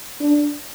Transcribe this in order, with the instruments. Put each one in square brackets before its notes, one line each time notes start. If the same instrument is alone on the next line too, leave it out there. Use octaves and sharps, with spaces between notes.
[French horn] D4